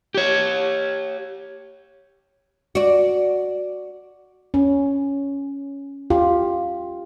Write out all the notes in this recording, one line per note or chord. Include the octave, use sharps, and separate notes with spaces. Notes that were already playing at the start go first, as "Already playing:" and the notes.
G4 C#5
F#4 D5
C#4
F4 G4